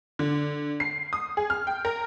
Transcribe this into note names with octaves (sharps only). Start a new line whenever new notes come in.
D3
C7
D#6
G#4
F6
G5
A#4